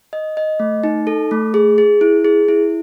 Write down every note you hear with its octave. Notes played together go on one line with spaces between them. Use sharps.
D#5
D#5
A3
D#4
A4
A3
G#4
G#4
E4
G#4
E4